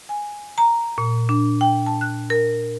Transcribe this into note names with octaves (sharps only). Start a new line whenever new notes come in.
G#5
A#5
A#2
D4
G5
A5
F#6
A#4